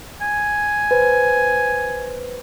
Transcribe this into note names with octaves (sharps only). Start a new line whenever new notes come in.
G#5
B4 C5